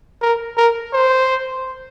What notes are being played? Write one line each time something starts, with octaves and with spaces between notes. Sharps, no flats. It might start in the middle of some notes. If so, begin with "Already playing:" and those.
A#4
A#4
C5